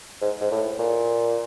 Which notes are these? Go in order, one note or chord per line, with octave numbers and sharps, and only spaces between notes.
G#2
G#2
A2
A#2